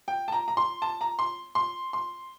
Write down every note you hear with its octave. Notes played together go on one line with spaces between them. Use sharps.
G5
A5
A#5
A#5
C6
A5
A#5
C6
C6
C6